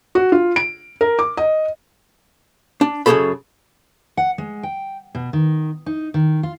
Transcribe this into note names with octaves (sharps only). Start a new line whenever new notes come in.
F#4
F4
D7
A#4
D6
D#5
D4
F#2 C#3 F#3 G#4 A4 B5
F#5
G#3
G5
B2
D#3
D#4
D#3
F4